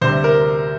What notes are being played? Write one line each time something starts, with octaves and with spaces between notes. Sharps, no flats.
D2 C3 G3 C5
A#4